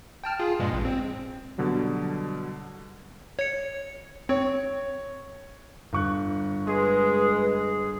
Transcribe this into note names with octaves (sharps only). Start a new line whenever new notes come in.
G5 A5 F6
F4 G#4
G2 A#2 G#3
A1
C4
B2 D3 F#3 G3
C#5 C#7
C4 C#5
G1 C#6 F#6
G#3 G#4 B4